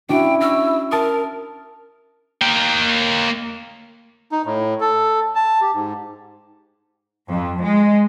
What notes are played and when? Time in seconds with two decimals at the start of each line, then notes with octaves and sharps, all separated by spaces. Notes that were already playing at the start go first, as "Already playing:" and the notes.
0.09 C#4 D4 E4 F#4 G5
0.41 C#6 E6 F6 A#6
0.92 A#4 A5 D#6
2.41 A#3 G5
4.32 D#4
4.46 A2
4.80 A4
5.35 A5
5.61 G4
5.74 G#2
7.29 F2
7.62 G#3